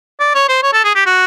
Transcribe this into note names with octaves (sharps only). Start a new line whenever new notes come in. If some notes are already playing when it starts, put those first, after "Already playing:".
D5
C#5
C5
C#5
A4
G#4
G4
F#4